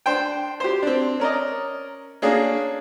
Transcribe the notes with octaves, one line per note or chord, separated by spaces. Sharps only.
D4 C5 G5
G4 C5
C4 D4
C#4 A#4 D5 D#5
A#3 C#4 D4 G#4